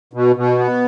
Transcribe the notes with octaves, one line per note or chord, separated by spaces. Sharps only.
B2
B2
B3